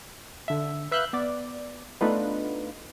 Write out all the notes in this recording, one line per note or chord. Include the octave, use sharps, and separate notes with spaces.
D3 E5
B4 E5 F5 F#6 G6
B3 D5
A3 B3 D4 D#4 F4 B4